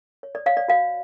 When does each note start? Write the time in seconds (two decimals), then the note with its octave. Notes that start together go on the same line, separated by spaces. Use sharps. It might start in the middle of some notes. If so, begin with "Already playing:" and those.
0.23 C#5
0.35 D5
0.46 C#5 F5
0.57 D5
0.68 F#4 F5